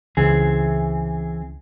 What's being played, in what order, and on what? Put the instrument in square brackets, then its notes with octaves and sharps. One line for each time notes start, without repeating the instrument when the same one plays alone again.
[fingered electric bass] C#2 C#3 [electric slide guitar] E3 C4 G#4